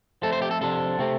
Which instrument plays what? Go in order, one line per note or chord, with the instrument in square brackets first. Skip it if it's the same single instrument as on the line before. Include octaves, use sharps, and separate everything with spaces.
[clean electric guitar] F3 A3 C4 A4
C5
G4
A4
C3 F3 D4 A4
C3 A3 C4